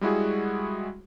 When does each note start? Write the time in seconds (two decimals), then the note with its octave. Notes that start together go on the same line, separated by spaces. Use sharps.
0.01 G3 G#3 E4 F#4 G#4